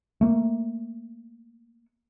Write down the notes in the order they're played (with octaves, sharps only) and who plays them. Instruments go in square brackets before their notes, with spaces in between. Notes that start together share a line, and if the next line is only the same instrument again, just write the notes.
[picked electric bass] A3 A#3